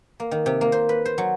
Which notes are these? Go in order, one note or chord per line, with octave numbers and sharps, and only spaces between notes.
A#3
D#3
C3
A#3
C5
B4
C5
F#3